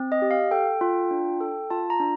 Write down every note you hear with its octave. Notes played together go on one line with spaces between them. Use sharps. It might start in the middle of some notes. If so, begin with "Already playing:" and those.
Already playing: C4
D#5
G4
F5
A4 G5
F4
D4
A4
F4 A5
A#5
D4